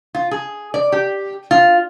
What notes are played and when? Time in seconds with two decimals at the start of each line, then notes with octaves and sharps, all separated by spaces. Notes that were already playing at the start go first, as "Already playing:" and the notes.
0.15 F4
0.31 G#4
0.74 D5
0.92 G4
1.51 F4